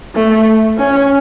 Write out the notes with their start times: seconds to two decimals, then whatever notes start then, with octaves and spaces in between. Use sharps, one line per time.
0.15 A3
0.78 C#4